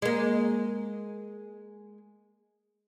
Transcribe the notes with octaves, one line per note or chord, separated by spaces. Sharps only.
G#3 A#3